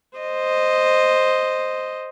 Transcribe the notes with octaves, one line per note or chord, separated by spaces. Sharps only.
C5 D#5